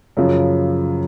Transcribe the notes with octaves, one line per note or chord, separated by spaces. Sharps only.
F#2 C#3 F3